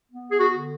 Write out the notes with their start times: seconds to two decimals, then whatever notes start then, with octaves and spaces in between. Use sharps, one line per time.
0.10 B3
0.32 G#4
0.38 F#4
0.52 D3